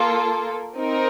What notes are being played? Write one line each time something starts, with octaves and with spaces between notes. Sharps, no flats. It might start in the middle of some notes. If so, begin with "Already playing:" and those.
Already playing: A#3 F4 A4
C4 D#4 A#4